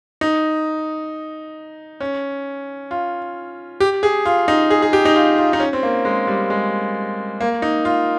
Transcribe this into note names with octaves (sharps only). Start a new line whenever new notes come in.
D#4
C#4
F4
G4
G#4
F4
D#4
G#4
G#4
G4
D#4
F4
F4
D#4
C#4
C4
A#3
G#3
G3
G#3
A#3
D#4
F4